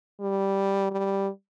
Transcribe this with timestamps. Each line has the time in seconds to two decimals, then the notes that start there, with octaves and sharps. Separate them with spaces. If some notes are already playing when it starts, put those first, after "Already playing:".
0.21 G3
0.91 G3